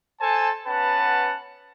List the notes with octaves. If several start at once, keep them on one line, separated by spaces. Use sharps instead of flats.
A4 C5 G#5 A5
B3 C#4 B4 F#5 A5